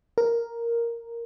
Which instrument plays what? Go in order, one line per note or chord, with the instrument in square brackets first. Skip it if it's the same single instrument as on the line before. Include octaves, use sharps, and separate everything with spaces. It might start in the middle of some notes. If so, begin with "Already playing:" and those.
[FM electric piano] A#4